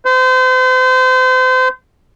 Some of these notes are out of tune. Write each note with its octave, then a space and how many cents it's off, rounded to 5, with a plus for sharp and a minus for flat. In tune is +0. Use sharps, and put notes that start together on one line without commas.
C5 -35